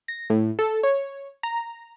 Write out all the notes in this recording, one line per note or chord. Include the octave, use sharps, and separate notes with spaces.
A#6
A2
A4
C#5
A#5